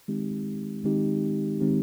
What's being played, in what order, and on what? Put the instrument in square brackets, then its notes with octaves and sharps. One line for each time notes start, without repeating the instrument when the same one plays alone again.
[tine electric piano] D#3 G#3 C4 D#4 G4
D#3 G#3 C4 D#4 G4
D#3 G#3 C4 D#4 G4